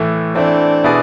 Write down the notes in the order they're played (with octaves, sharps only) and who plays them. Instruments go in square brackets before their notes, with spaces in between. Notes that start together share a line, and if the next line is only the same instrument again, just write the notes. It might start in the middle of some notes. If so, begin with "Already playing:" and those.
Already playing: [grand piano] A2 E3 A3
[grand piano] E3 A3 C4 E4 [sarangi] D4
[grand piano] B2 B3 E4 G#4 D5